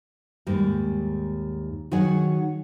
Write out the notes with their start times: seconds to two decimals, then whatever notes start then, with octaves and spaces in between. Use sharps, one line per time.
0.47 D#2 G#2 G3
1.92 D#3 F#3 G#4 C#5 F#5 G#5